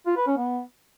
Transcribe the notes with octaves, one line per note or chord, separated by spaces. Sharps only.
F4
B4
C#4
B3